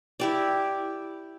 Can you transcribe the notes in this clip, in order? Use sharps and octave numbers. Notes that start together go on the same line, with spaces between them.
E4 G4 D5